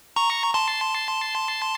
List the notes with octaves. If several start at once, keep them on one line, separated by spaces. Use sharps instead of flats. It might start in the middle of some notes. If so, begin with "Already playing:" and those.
A#5 C#6
A5 C6